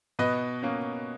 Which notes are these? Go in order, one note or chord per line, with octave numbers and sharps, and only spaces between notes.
B2 B4 D#5
A#3 C#4